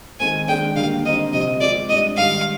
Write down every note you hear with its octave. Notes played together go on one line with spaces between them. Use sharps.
D#3 G#3 C4 G#5
D#3 G#3 D4 G5
D3 G3 A#3 F5
D3 G3 C4 D#4 D#5
C3 F3 C4 D#5
G#3 C4 F4 D5
G#2 G3 D4 D#5
G#2 D#3 G3 F5